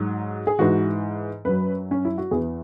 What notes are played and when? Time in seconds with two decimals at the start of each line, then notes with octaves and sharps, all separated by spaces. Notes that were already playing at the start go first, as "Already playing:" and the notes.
Already playing: G#2 F#3
0.47 G#4
0.59 G#2 E3 F#4
1.45 F#2 F#3 B4
1.91 C#4
2.05 E4
2.18 F#4
2.31 E2 E3 G#4